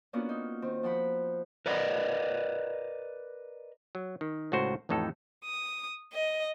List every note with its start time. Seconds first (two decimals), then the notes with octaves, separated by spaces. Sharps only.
0.13 A#3 B3 C#4 D4 F4 F#4
0.29 D#4
0.62 D#3 C4
0.83 F3 C4 F#5 B5
1.66 A#4 B4 D5 D#5
3.95 F#3
4.21 D#3
4.52 C#2 A2 F#4 C5
4.89 A1 F2 A2 D#4 A4
5.45 D#6
6.13 D#5